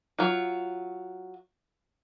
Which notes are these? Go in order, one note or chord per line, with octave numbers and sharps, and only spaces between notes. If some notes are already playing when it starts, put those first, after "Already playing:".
F#3 F4